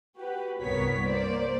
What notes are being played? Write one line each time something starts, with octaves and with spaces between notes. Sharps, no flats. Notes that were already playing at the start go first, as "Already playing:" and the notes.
F#4 G4 B4
C2 G2 B3 A#4 C#5 B6
A#3 C5 D5